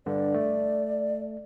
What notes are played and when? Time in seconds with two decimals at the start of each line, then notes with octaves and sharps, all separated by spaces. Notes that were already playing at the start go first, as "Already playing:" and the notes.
0.06 G2 D3 D5
0.34 A3